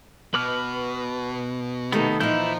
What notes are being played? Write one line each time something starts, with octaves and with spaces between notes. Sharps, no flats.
B2 B4 D6 F6
C3 D#3 A3 B3 D#4
A#2 E3 F3 D#4 E4 G6